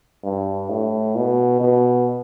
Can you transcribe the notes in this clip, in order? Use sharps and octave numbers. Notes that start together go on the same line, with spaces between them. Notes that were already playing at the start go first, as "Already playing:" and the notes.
G2
A2
B2
B2